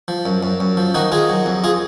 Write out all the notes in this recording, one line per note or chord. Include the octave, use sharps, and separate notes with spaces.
F3
F#2
F#2
F#2
F3
D#3 D#4 F#4
D#3 F4 G#4
F#3
F2
F4 G#4